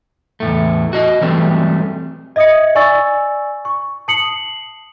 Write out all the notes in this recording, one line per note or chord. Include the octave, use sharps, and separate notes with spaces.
E2 A2 A3
F#4 D#5
E3 F#3 G3 A3 C4
D#5 E5 D#6 G#6 C#7
D5 G#5 C#6 E6 A6
C#6
A5 D#6 C7 C#7 F#7